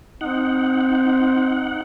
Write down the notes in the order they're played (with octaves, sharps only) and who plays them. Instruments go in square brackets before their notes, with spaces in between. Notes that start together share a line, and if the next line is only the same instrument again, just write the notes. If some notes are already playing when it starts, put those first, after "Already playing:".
[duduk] C4 [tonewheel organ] D#4 F#5